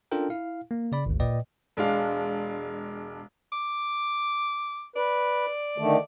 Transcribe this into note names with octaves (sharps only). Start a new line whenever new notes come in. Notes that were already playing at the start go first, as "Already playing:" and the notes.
C#4 D4 F4 A4 A#4 G5
E4 F5
A#3
C#3 D5 B5
G#1 D2
A#2 B4 D5 D#5 G5
E1 G#3 D4 F5
D6
B4 D5
D3 D#3 A3